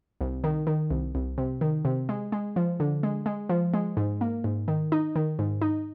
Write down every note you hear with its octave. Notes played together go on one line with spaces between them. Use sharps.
C2
D#3
D#3
C2
C2
C3
D#3
C3
G#3
G#3
F3
D3
G#3
G#3
F3
G#3
G#2
A#3
G#2
D#3
D#4
D#3
G#2
D#4